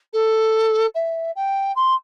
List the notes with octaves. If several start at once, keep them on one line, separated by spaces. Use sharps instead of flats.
A4
E5
G5
C6